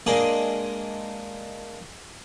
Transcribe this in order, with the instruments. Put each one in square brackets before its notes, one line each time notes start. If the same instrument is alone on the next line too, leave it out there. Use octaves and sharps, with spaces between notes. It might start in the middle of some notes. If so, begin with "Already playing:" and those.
[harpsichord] G#3 A#3 D4 G#4